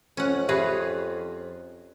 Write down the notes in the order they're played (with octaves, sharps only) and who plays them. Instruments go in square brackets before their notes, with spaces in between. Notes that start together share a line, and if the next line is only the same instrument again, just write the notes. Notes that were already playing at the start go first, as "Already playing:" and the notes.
[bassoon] F2 [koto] C#4 F#5
[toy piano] G4 E5 [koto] G#4 B4 C#5